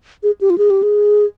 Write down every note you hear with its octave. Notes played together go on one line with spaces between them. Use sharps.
G#4
G4
F4
G#4
G4
G#4